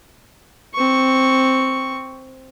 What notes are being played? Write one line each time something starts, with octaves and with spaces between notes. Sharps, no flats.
C4 C#6